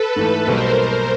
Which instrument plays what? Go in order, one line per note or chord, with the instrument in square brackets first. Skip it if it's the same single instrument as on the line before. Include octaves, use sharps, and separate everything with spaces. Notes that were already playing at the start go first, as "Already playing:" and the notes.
Already playing: [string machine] A4 B4
[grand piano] G#2 E3 A3
[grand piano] B1 B2 G3 A#3 D#4 [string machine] A#4 C5